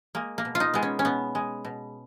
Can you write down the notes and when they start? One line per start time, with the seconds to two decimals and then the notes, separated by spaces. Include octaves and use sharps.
0.15 G#3 A#3
0.38 A#3
0.45 B2
0.55 F4
0.60 D#4
0.74 G#3 B3
0.83 C#4
0.99 C#4
1.05 B2 B3
1.35 G#3
1.65 B2